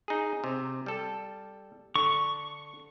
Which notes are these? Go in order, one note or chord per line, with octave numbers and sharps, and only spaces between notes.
D#4 G#4
C3
G3 A4
D3 C#6